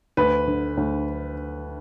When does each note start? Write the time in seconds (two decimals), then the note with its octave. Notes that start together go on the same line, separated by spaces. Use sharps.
0.17 D2 B4
0.47 D3
0.77 D2